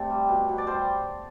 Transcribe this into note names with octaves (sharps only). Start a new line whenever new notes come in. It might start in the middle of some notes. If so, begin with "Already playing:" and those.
Already playing: C3 A3 A4 D5
G3
B2
B2
D5
G3 C5